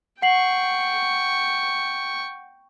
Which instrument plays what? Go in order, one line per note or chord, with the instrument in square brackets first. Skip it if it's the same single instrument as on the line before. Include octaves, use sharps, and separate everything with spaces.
[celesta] F#5 C7 F#7 [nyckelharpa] G5 C#6